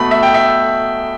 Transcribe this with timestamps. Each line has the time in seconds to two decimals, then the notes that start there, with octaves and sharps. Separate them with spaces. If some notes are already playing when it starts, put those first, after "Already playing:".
Already playing: B2 A3 B5
0.11 E5
0.23 G5
0.34 E5